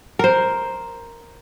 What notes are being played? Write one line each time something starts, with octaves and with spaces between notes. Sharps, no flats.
A#4 C5